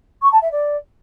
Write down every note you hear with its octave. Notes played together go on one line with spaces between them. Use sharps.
C#6
A5
E5
D5